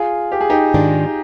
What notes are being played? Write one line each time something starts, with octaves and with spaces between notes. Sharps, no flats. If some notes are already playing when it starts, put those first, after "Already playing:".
Already playing: F4 G#4
G4
G#4
D#4 G4
G#2 D#3 G#3 D4 F4